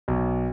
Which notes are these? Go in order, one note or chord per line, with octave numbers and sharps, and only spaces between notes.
B1